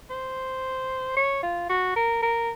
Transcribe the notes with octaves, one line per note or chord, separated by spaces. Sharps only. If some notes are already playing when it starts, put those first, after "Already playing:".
C5
C#5
F4
F#4
A#4
A#4